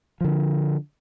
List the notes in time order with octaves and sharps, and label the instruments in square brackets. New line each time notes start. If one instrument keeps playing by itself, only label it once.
[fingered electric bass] D3 F3